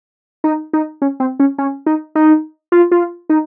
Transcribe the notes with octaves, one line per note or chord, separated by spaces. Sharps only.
D#4
D#4
C#4
C4
C#4
C#4
D#4
D#4
F4
F4
D#4